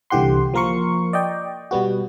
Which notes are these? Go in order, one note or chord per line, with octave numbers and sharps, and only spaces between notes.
C2 D3 E3 G4 F#5 C6
F3 A#3 A#4 C6 C#6
D5 D#5 G5
B2 G3 B3 F#4